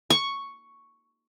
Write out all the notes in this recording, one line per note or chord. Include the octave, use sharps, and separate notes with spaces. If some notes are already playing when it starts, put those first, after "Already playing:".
C#6